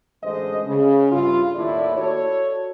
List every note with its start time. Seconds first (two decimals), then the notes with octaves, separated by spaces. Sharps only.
0.24 A1 D3 G#3 C5 D#5
0.66 C#3
1.11 G2 E4 F4
1.56 D#2 A2 E4 D5
1.97 F#4 A4 C#5